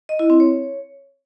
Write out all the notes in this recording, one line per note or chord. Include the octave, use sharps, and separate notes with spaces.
D#5
E4
C4
C#5